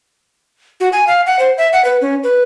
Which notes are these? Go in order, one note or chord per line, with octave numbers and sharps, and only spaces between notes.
F#4
G#5
F5
F#5
C5
E5
F#5
B4
C#4
B4